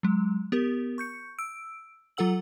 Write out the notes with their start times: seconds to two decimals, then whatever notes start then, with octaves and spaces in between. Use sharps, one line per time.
0.03 F#3 G#3
0.52 B3 G4 A#4
0.98 C#6 G6 C#7
1.39 E6 D7
2.17 F#3 F4 A4 F#5 E6 F#7